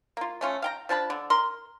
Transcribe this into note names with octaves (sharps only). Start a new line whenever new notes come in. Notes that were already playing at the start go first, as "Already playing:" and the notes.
A#3 F4
A3 C#4 F4
F5 G5 A#5
F3 D4 A5 B5
D3
A#4 C6